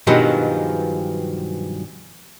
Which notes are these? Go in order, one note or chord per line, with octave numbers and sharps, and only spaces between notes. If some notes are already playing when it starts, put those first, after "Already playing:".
G2 B2 D#3 F3 F#3 G#3